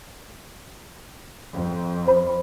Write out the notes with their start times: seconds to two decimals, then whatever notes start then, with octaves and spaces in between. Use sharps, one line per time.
1.53 F2
2.08 C5 B5